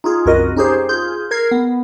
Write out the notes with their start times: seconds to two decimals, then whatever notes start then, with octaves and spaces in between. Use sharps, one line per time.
0.04 D#4 F4 G#4
0.25 C2 F#2 F#4 A#4 D#5
0.56 C#4 D#4 G4 G#4 C5
0.89 F4 G#4 G6
1.31 A#4 G#6 C7
1.51 B3